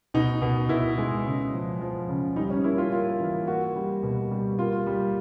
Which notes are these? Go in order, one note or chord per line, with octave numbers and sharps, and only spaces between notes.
B2 D#4
B2
B2 E4
G#3
C#3
F3
F3
C#3
G3 D#4
C#4
A#3 E4
F4
A#3 F4
E3
A#3 F#4
G3
B2
G3
A#3 F4
G3